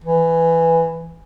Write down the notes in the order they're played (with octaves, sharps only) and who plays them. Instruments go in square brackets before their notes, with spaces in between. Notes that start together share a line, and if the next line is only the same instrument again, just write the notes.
[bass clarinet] E3